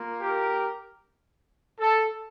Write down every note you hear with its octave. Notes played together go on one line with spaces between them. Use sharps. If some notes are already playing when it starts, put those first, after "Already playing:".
Already playing: A#3 F4
G4 A#4
A4